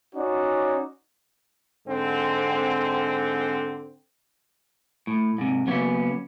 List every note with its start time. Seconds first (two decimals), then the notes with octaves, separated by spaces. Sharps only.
0.15 C#4 D#4 F#4 C#5 D5
1.88 G#2 D3 C4
5.07 A2
5.38 G#2 C3
5.67 C#3 F#3 A#3 B3 C#4